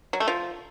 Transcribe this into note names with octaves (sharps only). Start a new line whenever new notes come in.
F#3
A3
F3